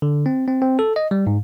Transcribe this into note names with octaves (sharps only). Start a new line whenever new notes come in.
D3
C4
C4
C4
A4
D#5
G3
G#2